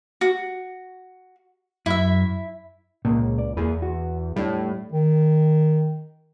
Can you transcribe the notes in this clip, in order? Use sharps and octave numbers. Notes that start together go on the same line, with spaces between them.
F#4
F#2 E4 E5
C#2 A#2 A#3
D5
E2 A#3 G#4 B4
F#4
A2 G3 D4
D#3